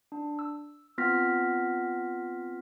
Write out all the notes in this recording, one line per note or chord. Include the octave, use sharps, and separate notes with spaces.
D4
E6
B3 C4 F4 F6 A#6 B6